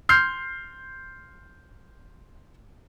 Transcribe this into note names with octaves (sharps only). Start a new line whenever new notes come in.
C6 F6 G6 C7